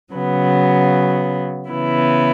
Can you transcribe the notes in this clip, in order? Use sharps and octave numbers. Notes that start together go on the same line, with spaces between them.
C#3 F#3 B3
C#3 E3 B3 E4